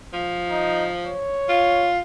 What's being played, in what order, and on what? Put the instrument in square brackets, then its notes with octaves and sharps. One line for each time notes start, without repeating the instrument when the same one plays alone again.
[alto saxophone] F3
[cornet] D#4
C#5
[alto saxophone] F4